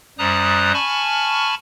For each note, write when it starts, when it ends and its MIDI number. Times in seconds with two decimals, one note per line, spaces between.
0.19 0.72 42
0.19 0.72 55
0.19 0.72 72
0.19 0.72 82
0.19 0.72 87
0.19 0.72 90
0.74 1.55 80
0.74 1.55 81
0.74 1.55 83
0.74 1.55 85
0.74 1.55 89